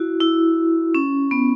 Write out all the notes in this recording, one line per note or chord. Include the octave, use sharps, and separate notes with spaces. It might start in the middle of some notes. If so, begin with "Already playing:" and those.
Already playing: E4 F#4
E4
C#4
B3